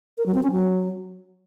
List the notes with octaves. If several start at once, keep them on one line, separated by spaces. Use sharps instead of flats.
A#4
F#3
C4
C#4
F#3